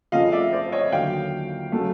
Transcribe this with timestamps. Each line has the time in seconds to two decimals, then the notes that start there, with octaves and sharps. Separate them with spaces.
0.12 F2 C#3 F3 A3 D#5 F5
0.32 D5 E5
0.52 C5 D5
0.72 C#5 D#5
0.92 D#2 D3 F#3 F5 G5
1.72 C#3 F#3 A3